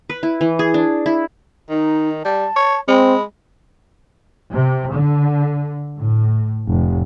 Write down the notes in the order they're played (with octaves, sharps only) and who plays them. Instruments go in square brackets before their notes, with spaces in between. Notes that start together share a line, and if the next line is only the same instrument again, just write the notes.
[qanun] B4
E4
E3
G#4
D4
E4
[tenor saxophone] D#3 [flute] D#4
[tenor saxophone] G3 [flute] A5
[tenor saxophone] C#5
[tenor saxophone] G#3 [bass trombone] C4 [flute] B5
[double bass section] C3
D3
A2
F1